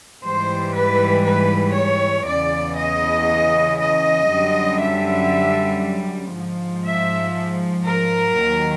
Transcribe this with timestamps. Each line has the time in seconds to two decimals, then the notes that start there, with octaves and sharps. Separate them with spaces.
0.23 G#2 E3 G3 C5
0.74 B4
1.25 B4
1.75 C#5
2.26 E2 C#3 E3 D5
2.78 D#5
3.78 D#5
4.30 F#2 D3 G3
4.81 E5
6.34 G#2 F3
6.85 E5
7.86 A#4
8.37 D#2 D#3 F#3